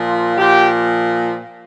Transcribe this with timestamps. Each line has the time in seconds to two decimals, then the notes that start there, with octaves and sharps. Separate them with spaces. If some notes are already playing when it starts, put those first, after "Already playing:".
Already playing: A#2 F3
0.37 A#2 F3 G4